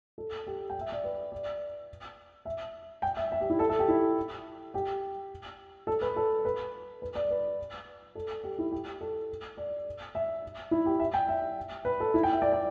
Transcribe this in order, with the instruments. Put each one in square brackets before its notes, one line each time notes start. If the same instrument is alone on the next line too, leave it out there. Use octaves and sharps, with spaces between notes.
[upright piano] A4
G4
G5
E5
D5
B4
D5
E5
G5
E5
E5
G4
E4
A4
A4
G4
E4
G4
A4
B4
A4
B4
B4
D5
B4
A4
G4
E4
G4
A4
D5
E5
E4
G4
E5
G5
E5
B4
A4
E4
G5
E5
D5
D5